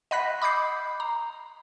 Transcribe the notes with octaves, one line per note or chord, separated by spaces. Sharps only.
D#5 F#5 B5 F#6 A#6 B6
B5 D6 D#6 G6 C7
A#5